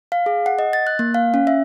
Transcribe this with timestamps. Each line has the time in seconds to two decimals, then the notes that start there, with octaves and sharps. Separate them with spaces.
0.12 F5
0.26 G#4
0.46 F#5
0.59 D#5
0.73 A6
0.87 F#6
0.99 A#3
1.14 F5
1.34 C#4
1.47 E5